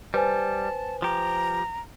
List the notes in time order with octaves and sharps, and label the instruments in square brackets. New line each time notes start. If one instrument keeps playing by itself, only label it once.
[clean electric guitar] G3 [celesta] B4 C5 G#5 [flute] A5
[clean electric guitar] F3 G4 [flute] A#5